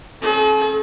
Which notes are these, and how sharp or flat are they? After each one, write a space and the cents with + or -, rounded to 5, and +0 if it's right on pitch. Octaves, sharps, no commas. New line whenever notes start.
C#4 -40 A4 -45